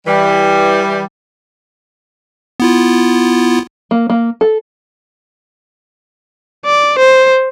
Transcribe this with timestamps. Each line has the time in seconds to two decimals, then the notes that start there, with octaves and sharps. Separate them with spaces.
0.06 E3 G3
2.60 B3 E4 F4
3.91 A#3
4.10 A#3
4.41 A4
6.65 D5
6.98 C5